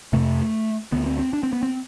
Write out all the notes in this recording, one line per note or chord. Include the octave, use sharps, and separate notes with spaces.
F2 C3 A3
D2 D3 B3
C4
C4
D4
C4
B3
C4